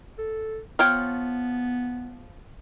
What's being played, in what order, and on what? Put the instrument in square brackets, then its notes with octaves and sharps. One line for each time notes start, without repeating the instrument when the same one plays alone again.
[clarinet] A4
[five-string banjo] F3 C#5 G5 [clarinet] B3 [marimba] F6